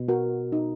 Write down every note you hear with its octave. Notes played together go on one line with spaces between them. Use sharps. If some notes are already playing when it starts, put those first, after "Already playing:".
Already playing: B2
F#4 A#4
D#4